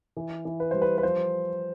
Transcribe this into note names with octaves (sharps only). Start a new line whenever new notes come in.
E3
E3
B4
G3 C5
B4
B4
F3 C5